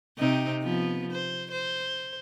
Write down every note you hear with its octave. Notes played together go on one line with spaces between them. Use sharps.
C3 C4 D#4
F3 B3
C5
C5